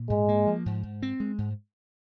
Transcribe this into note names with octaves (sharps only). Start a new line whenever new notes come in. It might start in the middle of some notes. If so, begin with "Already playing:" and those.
Already playing: A#2
G#2 G#3
A#3
F3
G#2
G#2
C4
G#3
G#2